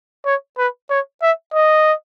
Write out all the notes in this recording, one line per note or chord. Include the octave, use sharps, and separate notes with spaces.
C#5
B4
C#5
E5
D#5